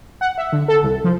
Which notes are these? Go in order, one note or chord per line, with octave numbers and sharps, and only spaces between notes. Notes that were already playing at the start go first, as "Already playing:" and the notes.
F#5
E5
D3
A4
C2
F3